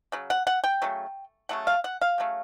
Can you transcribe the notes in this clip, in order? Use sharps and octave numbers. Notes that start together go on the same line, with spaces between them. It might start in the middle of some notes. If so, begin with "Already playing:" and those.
C#3 F#3
F#5
F#5
G5
C#3 F#3 A3
C#3 F#3 A3 F#5
F5
F#5
F5
C#3 F#3 A3